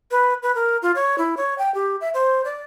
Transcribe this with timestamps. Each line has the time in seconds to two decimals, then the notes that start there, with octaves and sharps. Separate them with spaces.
0.11 B4
0.43 B4
0.55 A#4
0.82 F4
0.95 C#5
1.18 E4
1.37 C#5
1.58 G5
1.75 G4
2.01 E5
2.14 C5
2.45 D5